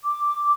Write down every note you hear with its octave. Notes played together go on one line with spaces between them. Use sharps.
D6